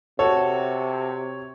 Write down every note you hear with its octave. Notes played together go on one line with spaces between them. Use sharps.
C3 F#4 A4 C#5